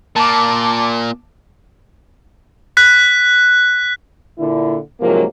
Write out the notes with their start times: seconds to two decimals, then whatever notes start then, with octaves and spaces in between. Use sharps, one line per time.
0.16 A#2 A5 D6
2.77 F#6 B6
4.38 A#2 D3 E4
5.00 G#2 C3 F3 F#3 A#3